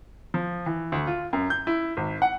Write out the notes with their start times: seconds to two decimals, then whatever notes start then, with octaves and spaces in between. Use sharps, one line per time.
0.34 F3
0.66 E3
0.92 D2
1.07 F4
1.33 F#2
1.50 G6
1.67 E4
1.97 G#1
2.22 F#5